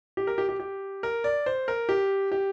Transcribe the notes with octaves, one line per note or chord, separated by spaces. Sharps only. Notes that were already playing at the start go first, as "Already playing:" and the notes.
G4
A#4
G4
G4
G4
A#4
D5
C5
A#4
G4
G4